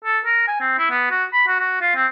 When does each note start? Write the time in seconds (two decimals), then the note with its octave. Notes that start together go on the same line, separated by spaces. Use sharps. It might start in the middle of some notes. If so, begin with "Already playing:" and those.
0.05 A4
0.26 A#4
0.48 G#5
0.60 C4
0.78 E4
0.90 B3
1.11 F#4
1.33 B5
1.47 F#4
1.60 F#4
1.81 F4
1.96 C4